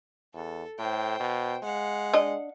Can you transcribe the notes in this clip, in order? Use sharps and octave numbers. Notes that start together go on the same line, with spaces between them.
E2 A4
A2 C5 G5
B2
G#3 F5 F#5
D4 D#5